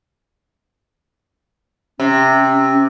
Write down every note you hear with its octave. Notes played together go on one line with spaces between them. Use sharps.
C3 C#4